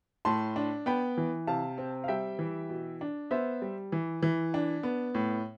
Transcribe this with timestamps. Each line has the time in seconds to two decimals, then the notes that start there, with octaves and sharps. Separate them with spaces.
0.25 A2 A5 C6
0.56 D4
0.86 B3 G5 B5
1.17 E3
1.47 C3 F5 A5
1.78 C4
2.04 F5
2.08 G3 E5 G5
2.39 E3
2.69 B2
3.01 D4
3.31 B3 C5 E5
3.62 G3
3.92 E3
4.23 E3
4.54 D4
4.83 B3
5.15 A2